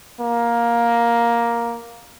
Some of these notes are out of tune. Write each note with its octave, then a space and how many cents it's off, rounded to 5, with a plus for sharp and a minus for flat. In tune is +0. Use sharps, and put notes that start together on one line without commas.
A#3 +10